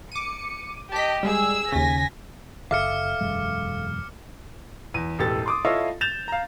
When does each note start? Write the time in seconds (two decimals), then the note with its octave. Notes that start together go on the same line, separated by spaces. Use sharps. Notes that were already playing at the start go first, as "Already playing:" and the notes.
0.12 D6 C#7 D#7
0.92 G4 D#5 A5 B6
1.23 G3 G#3 G#4 E6
1.72 D#2 C#3 G#5 A#6 B6
2.71 F#1 A4 E5 F5 D6 F6 C#7
3.21 E1 F#2 G#3
4.94 E2 D#7
5.18 E1 A1 G4 A4 A6
5.46 C6 D6 D#6
5.65 E4 F4 A4 C#5 D#5 F5
6.01 G6 A6 E7 F7
6.28 F5 A#5